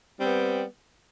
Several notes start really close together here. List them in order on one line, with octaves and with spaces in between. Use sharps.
G3 C4 B3